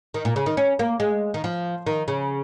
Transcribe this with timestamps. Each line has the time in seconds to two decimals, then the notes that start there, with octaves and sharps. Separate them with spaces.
0.14 D#3
0.25 A#2
0.36 C#3
0.46 D#3
0.57 C#4
0.79 A#3
1.00 G#3
1.34 D#3
1.44 F3
1.87 D#3
2.08 C#3